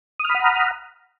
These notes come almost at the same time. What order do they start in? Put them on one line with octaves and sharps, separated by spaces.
D#6 F6 B5 F#5 A#5